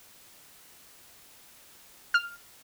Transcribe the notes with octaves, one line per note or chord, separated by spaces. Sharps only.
F6